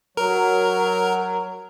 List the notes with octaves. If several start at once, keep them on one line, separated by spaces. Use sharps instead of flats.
F#3 A#4